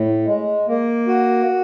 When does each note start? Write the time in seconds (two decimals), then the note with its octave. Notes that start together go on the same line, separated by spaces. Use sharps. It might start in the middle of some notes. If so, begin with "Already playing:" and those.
Already playing: A2
0.26 G#3
0.67 A#3
1.07 F#4